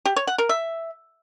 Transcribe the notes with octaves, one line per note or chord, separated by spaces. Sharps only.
G4
C#5
F#5
A#4
E5